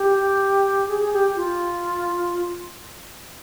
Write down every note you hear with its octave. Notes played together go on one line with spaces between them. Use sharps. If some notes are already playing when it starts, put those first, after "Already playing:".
Already playing: G4
G#4
G#4
G4
F4